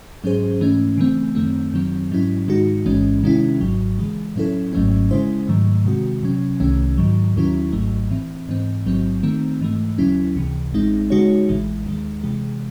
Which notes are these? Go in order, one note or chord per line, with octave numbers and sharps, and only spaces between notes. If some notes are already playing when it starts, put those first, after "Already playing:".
G#2 F#3 C#4 G#4 C5
G#2 E3 A3 C#4
C#3 E3 A3 C4
F#2 D#3 A3 C4
F#2 D#3 F#3 C4
G#2 F#3 C#4 E4
G#2 D#3 G#3 D#4 F#4
A1 G#2 E3 G#3 C#4
C3 D#3 G#3 C#4 E4
G#1 G#2 F#3
C#3 E3 G#3
A2 F#3 C#4 E4 A4
G#1 G#2 F#3 A3 C#4
C#3 G#3 C#4 E4 C5
G#2 D#3 F#3 A3
C3 D#3 G#3 C4 F#4
C3 F#3 C#4
C2 C3 D#3 A3 C#4
G#2 D#3 F#3
D#2 D#3 F#3 C#4 E4
G#1 G#2 F#3 A3
A2 E3 C4
G#2 E3 C4
A1 G#2 F#3 C4
D#3 A3 C4
G#2 E3 A3
D#2 C#3 F#3 C#4 E4
C#2 C3 E3
A1 A2 G#3 C4 D#4
C#3 G#3 D#4 F#4 C#5
A1 A2 E3 G#3
D#2 D#3 G#3
C3 E3 G#3